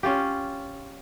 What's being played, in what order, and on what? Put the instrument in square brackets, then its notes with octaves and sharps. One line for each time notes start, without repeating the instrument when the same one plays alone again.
[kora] C#4 F4 G4